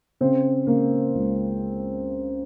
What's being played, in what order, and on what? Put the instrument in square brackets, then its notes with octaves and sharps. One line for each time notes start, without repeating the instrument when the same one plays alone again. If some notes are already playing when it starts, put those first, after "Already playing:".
[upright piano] C#3 C4
C#3 A#3
C#2